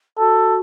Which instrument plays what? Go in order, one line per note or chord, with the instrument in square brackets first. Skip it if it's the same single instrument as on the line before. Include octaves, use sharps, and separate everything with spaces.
[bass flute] F#4 [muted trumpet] A4